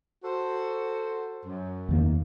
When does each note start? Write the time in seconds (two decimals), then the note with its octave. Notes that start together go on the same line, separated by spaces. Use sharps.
0.24 F#4 A4 C5
1.45 F#2
1.89 E2 D#3 A#3